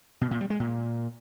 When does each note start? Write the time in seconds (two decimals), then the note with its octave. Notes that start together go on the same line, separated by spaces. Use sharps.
0.21 B2
0.31 A#2
0.41 G3
0.50 G#3
0.60 A#2